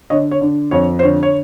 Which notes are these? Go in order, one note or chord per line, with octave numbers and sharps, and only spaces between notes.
D3 C#5 D#5
C#5
D3
F2 C#5
C5
D3 C#5
C#5